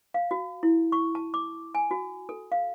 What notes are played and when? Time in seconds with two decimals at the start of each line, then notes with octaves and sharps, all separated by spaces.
0.14 F5
0.31 F#4
0.63 E4
0.92 C#6
1.15 A5
1.34 D6
1.75 G#5
1.91 F#4
2.29 A4
2.52 F5